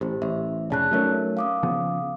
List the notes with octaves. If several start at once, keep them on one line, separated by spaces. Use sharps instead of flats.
A1 G4 C5
A1 E5
F1 C#3 D5 A5 F#6
F#3 A3 C#4 D#4 A#4
F5 D6 D#6
C#3 F3 B3